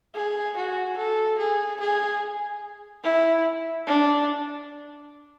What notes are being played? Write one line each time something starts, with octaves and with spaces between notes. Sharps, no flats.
G#4
F#4
A4
G#4
G#4
E4
D4